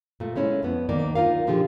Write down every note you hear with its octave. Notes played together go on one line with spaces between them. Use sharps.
A#2 A3
G#3 A3 C#4 E4
F2 B3
D2 D#3 A#3 D5
D#4 F4 A#4 F5
A#2 D3 F3 F4 G4 G#4